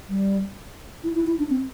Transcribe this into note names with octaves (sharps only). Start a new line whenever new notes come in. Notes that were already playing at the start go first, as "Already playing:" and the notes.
G3
E4
E4
E4
D4
C4